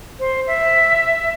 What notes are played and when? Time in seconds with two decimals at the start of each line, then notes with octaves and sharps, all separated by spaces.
0.19 C5
0.46 E5